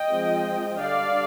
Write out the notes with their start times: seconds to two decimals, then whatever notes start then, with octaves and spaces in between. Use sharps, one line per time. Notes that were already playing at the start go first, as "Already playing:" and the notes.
Already playing: D#5 G5
0.09 F3 G#3 C4
0.80 D3 G3 D4 D5 F5